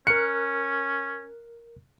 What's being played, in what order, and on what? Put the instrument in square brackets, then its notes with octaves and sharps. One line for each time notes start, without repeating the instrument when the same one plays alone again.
[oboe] C#4 [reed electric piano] A#4 F6 F#6 [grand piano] C#7